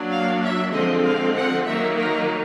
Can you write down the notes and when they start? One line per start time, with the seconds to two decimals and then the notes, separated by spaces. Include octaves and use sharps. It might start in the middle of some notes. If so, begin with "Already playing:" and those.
Already playing: F#3 A#3 D4
0.11 F5
0.42 E5
0.73 D3 F3 G#3 C4 D#5
1.05 F5
1.35 F#5
1.65 D#3 F#3 A#3 E5
1.96 A#4